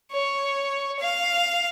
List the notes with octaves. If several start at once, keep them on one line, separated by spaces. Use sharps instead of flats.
C#5
F5